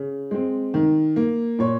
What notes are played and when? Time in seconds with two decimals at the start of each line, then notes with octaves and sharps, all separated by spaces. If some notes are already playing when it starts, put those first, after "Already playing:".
Already playing: C#3
0.31 G#3 C4
0.74 D#3
1.16 A#3
1.59 A#2 C#5